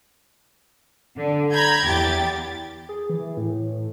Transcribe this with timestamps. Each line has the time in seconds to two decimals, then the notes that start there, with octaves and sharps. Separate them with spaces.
1.16 D3
1.52 A#5 B5 G6 G#6
1.83 E2 G4 A6
2.89 G#4
3.10 E3
3.37 A2